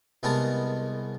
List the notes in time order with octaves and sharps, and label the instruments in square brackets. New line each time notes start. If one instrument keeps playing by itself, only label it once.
[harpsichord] C2 G#3 B3 A#4 A5